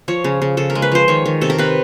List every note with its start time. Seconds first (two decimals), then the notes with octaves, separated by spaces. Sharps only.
0.08 F3 C#5
0.24 C#3
0.42 C#3
0.57 C#3 A4
0.70 A#4
0.75 G#3
0.82 B4
0.92 F3 C5
1.08 D#3 C#5
1.26 D#3
1.41 C3 A4
1.50 A#4
1.58 C3 B4